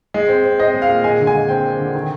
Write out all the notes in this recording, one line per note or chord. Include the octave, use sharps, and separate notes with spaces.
G#3
C4
C4
C4 D#5
G#3
F5
A#2
G#3 G#5
D3
G#5
G#3
C4 G5
C4
D3
D#3